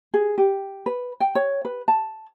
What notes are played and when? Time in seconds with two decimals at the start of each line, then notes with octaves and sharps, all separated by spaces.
0.14 G#4
0.38 G4
0.86 B4
1.20 G5
1.35 C#5
1.65 B4
1.88 A5